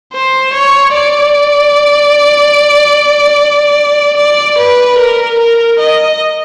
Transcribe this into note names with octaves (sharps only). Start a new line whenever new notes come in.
C5
C#5
D5
D5
B4
A#4
A#4
D#5